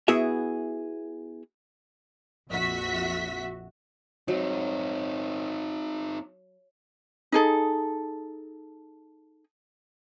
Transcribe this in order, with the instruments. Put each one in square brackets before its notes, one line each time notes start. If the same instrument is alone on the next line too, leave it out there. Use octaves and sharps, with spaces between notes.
[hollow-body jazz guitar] B3 E4 F#4 G#4 E5
[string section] A#1 F2 F#4 E5 B6
[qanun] F#3 [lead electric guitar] C4 D#4
[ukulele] D#4 G#4 A4